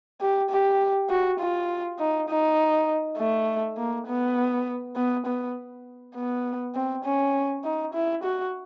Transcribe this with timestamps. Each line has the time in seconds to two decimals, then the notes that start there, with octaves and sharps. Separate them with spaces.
0.21 G4
0.50 G4
1.10 F#4
1.39 F4
1.99 D#4
2.29 D#4
3.18 A3
3.78 A#3
4.07 B3
4.96 B3
5.26 B3
6.15 B3
6.75 C4
7.04 C#4
7.64 D#4
7.94 E4
8.23 F#4